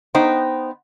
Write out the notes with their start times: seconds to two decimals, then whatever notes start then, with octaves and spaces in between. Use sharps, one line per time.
0.15 B3 D#4 C5 G5